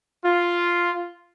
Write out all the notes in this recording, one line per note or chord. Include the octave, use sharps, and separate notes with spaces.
F4